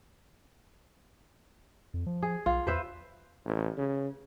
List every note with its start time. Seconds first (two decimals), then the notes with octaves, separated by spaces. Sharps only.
1.94 F2
2.06 F3
2.22 G#4
2.46 B1 F4
2.67 E2 B4 C5 E5
3.45 A1
3.77 C#3